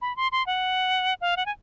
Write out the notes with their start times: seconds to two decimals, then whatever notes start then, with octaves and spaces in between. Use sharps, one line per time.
0.01 B5
0.16 C6
0.32 C6
0.46 F#5
1.21 F5
1.37 F#5
1.46 G#5